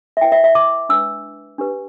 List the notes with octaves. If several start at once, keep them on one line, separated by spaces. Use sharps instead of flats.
E5
E4 B4 G5
E5
E5
D6
D4 B4 E6
D4 G4 B4